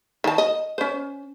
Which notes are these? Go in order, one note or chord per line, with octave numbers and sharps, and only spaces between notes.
D#3 A5
D#5
C#4 C5